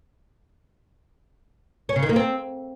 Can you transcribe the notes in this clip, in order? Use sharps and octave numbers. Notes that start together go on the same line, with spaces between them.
C#4
C#3
D#3
A#3
C4